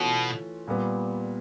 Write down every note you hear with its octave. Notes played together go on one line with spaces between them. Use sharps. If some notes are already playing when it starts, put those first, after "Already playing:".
Already playing: B2 E3 A3 C#4 F4
A#2 G3 B3